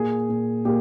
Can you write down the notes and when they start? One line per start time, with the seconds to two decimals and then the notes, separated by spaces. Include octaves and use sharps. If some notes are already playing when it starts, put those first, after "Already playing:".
Already playing: A#2 G#4
0.29 A#2
0.65 A#2 G4